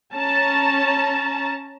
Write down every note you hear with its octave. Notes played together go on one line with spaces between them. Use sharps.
C#4 A5 A#5